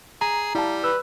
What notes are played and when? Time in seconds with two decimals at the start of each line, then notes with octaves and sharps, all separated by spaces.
0.21 G#4 A#5
0.55 G3 E4 F5 A5
0.84 B4 E6